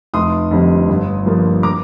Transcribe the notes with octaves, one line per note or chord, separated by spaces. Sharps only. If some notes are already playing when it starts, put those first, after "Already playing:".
F1 C6 D#6
F2 D3 G3 C4
G1
G2 F3 A#3
A#5 D6